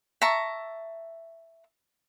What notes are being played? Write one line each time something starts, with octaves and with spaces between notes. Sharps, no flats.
E5 A5 A#5 C#6